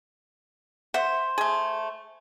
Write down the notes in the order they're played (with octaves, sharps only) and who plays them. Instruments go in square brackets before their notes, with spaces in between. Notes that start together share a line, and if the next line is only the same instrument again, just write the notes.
[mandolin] C5 [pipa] E5 F#5
[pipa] A3 G#4